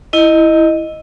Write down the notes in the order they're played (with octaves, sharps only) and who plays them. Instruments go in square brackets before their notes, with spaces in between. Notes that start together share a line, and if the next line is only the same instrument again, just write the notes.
[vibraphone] E4 D#5